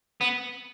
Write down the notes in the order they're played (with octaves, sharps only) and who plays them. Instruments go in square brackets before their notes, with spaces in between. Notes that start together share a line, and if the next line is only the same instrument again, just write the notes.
[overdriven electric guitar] B3